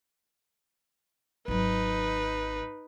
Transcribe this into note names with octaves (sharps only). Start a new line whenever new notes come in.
G#1 F#3 D#4 B4